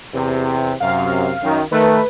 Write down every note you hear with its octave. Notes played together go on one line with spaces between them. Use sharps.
E2 C3
F#2 C3 F5
F#2 D#3
D#3 A3 B4